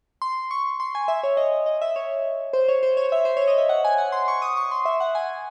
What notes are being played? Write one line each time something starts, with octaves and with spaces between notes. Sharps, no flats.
C6
C#6
C6
G#5
E5
C#5
D#5
D#5
E5
C#5
C5
C#5
C5
C#5
E5
C5
C#5
D#5
E5
F#5
G#5
F#5
C6
C#6
D#6
C#6
C6
E5
F#5
G#5